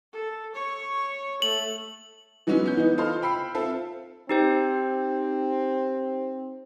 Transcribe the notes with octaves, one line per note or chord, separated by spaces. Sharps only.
A4
C#5 C#6
A3 F#7
E3 F#3 G#3 B3 C#4
B3 C#4 G6
E3 B3 D#4
F4 A4 C5 D#5 C6 F6
G5 B5 E6 C7
C4 F4 A4 E5
C4 D#4 G4 C5